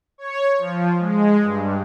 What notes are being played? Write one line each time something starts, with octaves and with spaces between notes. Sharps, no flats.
C#5
F3
G#3
G2